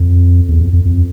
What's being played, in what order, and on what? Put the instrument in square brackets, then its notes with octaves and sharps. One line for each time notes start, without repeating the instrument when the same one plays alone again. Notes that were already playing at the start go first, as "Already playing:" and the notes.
Already playing: [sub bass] F2
E2
F2
F2
F2